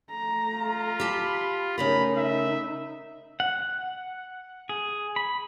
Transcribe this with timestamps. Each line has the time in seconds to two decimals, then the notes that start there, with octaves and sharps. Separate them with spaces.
0.10 A3 A#5
0.53 F4
1.00 G4 A5 B5
1.78 C#3 A3 D#4 A#4 B5
2.17 E5
3.40 F#5
4.69 G#4
5.16 B5